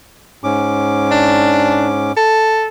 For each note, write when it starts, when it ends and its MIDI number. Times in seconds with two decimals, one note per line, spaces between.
0.44 2.12 44
0.44 2.12 61
0.44 2.12 86
1.11 1.89 62
2.17 2.67 69